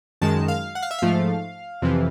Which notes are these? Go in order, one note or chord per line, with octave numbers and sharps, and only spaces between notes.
F#2 D#3 G#3 A5
F5
F#5
F5
E5
G#2 F3 A3 F5
F2 C3 E3